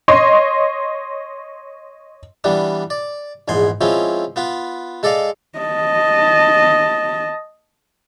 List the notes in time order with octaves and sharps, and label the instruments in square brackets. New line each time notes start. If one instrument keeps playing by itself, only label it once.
[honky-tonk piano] C#5 D#5 C6
[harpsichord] E3 G3 B3 D4
D5
A#1 E2 G#2 G#5 C6
F3 G#3 C4 C#4 E4 F4
B3 F4 B4
G#3 A4 D5 D#5 F5
[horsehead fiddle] D#5 A5